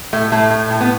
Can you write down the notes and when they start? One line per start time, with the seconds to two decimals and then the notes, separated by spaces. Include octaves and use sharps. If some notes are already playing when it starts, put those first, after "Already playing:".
0.13 A2 A3
0.32 A2 A3
0.50 A2
0.70 A2
0.81 B3